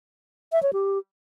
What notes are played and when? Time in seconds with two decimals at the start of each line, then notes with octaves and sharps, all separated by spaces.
0.52 E5
0.63 C#5
0.73 G4